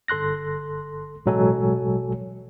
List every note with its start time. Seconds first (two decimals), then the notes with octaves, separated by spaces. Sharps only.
0.08 G1 A4 C6 F#6 A#6
1.26 A1 B2 F#3 G#3 A4 G#5